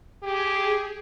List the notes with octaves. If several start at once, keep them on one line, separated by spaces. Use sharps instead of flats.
G4 G#4